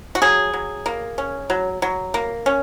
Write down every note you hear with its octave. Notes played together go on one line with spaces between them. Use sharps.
F#4
F#3 G#4
F#3
A#3
C#4
F#3
F#3
A#3
C#4